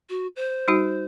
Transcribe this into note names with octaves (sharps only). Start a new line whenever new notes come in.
F#4
C5
G3 D#4 F#4